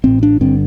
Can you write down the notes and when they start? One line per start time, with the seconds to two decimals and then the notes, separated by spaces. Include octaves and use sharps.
0.04 A1 A2 C4
0.23 D4
0.41 G1 G2 D3 C4